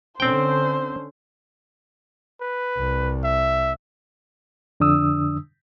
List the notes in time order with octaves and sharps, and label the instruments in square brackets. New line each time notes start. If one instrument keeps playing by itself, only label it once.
[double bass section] D3 C#4 [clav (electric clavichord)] C4 G5 [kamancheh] C5
[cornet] B4
[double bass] C2
[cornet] E5
[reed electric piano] F2 D3 D4 D#6 E6